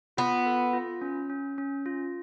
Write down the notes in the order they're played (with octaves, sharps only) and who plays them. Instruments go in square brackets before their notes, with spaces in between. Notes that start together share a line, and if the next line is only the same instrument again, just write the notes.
[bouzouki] B3 [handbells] F4
[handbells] A4
F4
C#4
C#4
C#4
F4